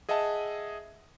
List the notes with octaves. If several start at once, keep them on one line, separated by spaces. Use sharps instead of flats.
G#4 D#5 E5 F#5 A5